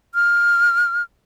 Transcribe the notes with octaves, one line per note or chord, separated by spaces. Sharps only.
F6